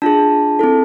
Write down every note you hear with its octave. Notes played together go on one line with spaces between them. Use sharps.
D4 F4 G#4 A5
C4 E4 A4